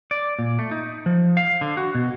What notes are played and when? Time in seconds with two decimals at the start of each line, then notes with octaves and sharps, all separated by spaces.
0.11 D5
0.39 A#2
0.59 A3
0.71 D#4
1.06 F3
1.37 F5
1.61 D3
1.77 F#4
1.95 B2